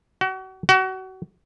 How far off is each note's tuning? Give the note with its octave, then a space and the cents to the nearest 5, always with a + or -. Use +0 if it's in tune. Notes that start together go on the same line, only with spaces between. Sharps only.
F#4 +35
F#4 +30